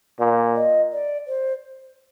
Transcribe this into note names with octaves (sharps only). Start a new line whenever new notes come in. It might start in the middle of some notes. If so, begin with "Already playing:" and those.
A#2 D5
D#5
D5
C5